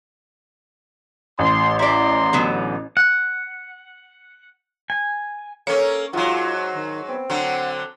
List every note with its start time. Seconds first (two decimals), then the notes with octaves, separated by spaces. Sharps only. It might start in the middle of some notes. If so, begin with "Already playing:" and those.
1.39 A1 C6
1.79 E4 D5 A#5 C6
2.33 D3 F#3 B3
2.97 F#5
4.90 G#5
5.67 A#3 C#4 A4 C#5
6.13 G#2 F#3 F4 F#4
6.74 D#3
7.08 B3 C4
7.30 D3 F#3 F#5